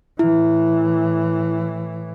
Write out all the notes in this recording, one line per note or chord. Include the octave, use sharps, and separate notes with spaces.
A2 E3 E4